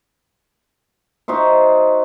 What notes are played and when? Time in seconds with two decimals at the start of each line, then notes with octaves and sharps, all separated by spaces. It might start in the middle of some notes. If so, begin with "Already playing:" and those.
1.28 D#4 F#4 C5 E5